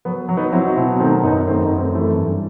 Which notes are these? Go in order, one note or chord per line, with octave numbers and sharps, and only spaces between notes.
F#3 B3
F#3
B3 D#4
F#3 C4 E4
D#4 F#4
B2 C4 E4
D#3 A3 C4
F#2 B3 D#4
D#3 A3 C4
B3 D#4
F#2
A3 C4
E3 A3 C4
G2